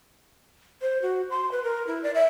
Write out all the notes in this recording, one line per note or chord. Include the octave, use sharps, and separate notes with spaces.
C5
F#4
C6
B4
A#4
E4
D5
E5